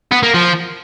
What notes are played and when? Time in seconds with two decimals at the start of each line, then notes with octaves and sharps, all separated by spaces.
0.11 B3
0.23 A#3
0.34 F3